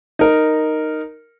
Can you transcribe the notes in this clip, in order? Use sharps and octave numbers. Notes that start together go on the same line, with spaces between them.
D#4 A#4